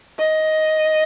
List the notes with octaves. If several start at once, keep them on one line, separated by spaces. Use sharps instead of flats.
D#5